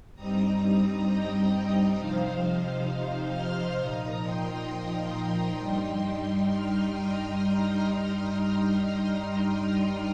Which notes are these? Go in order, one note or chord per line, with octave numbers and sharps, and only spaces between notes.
G2 G3 C4 D#4 A#5 D#6
D#5 G5
C3 F3 D#4 C5 F5
C6 F6
A#2 F3 D#4 A#5 D#6
G5 C6
G2 G3 D#4
C6 F6
A#5 D#6